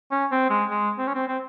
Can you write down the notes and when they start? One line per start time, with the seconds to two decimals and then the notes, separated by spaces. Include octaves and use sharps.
0.11 C#4
0.32 C4
0.50 G#3
0.70 G#3
0.98 C4
1.07 C#4
1.15 C4
1.28 C4